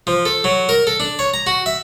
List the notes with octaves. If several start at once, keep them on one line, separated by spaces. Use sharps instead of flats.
F3
A4
F#3
A#4
A4
D4
C#5
A#5
F#4
E5